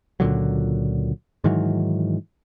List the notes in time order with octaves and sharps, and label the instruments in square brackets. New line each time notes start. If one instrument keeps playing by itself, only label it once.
[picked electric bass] C#2 A#2 D3 F#3
G#2 D#3 E3 F#3